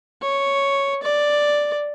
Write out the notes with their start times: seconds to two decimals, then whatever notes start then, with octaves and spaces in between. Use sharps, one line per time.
0.22 C#5
1.02 D5